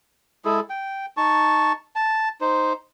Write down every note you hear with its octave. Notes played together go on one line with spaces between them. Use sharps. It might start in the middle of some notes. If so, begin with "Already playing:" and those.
G#3 E4 G#4 A4
G5
D#4 A5 C#6
A5
D#4 C5